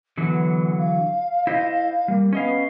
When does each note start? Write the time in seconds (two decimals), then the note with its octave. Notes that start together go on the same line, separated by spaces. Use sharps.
0.17 D3 E3 F#3 B3
0.77 F5
1.47 E4 C5 D#5
2.08 G3 A#3
2.33 B3 C#4 D#5 F5